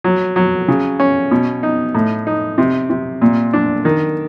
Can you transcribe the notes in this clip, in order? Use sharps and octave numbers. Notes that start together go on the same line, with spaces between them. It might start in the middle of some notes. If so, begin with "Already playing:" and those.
F#3
F#3
C#3
C#4
B2
D#4
A2
D#4
C3
C3
A#2
D4
D#3